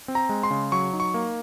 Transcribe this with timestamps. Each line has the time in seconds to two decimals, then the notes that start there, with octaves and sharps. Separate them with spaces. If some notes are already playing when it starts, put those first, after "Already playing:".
0.08 C4
0.15 A#5
0.29 G#3
0.43 C6
0.51 C#3
0.72 F#3 C#6
0.93 D#4
1.00 C#6
1.14 A#3